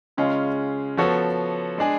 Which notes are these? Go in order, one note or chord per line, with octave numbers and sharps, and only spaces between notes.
C#3 G#3 C#4 F4
F3 B3 F#4 A4 C#5
G#3 D4 G#4